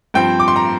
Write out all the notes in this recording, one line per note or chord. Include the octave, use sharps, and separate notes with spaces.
G2 F3 C4 G5
D6
C6
A#5